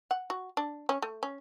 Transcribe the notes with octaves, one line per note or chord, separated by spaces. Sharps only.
F#5
F#4
D4
C#4
A3
C#4